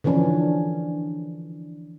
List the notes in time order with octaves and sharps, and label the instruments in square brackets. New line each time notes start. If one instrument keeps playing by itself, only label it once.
[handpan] D3 E3 F3 C#4 D4